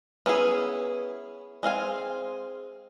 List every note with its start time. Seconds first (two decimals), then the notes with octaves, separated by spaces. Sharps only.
0.26 B3 C#4 E4 G#4
1.63 G#3 C4 F5 G#5